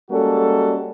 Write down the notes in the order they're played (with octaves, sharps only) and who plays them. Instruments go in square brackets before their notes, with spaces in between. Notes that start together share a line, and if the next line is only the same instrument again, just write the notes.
[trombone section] G3 G#3 A#3 C#4 F#4 A4